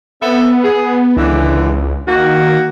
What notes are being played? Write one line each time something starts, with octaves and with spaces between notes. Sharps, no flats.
B3 C4 A4 E5
G#4
C#2 D3 E3
D#3 A#3 F#4